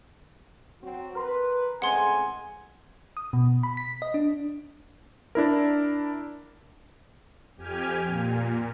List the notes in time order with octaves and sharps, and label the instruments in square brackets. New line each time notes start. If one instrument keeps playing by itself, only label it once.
[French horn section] F#3 C4 F#4
[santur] A#4 C6 [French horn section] B4
[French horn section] A2 C#3 C4 [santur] G#3 [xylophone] F#5 C6 [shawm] G#5
[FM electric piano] D#6
B2
B5
B6
D#5
D4
[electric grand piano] D4 E4 A#4
[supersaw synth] F2 G4 G#5 F6
A#2